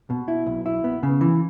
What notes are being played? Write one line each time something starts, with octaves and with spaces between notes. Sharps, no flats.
B2
E4
B1
E4
B3
C#3
E3